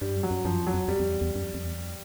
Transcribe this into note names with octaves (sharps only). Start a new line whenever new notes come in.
G2 G3
F#2
F#3
F#2
F#2 F3
F2
F#3
F2
F2 G3
F2
E2
E2
F#2
F2
F2
E2
F2